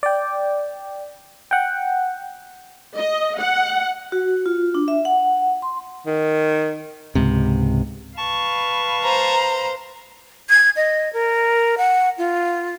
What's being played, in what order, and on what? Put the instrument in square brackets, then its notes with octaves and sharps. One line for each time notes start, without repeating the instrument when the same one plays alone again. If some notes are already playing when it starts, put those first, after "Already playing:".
[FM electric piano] D5 G5
F#5 G5
[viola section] D#5
F#5
[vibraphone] F#4
F4
D4
E5
F#5
C6
[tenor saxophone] D#3
[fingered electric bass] C#2 G#2 C3
[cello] B4 F5 [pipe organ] A5 C#6
[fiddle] C5 [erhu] A#5
[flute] G#6
D#5
A#4
F#5
F4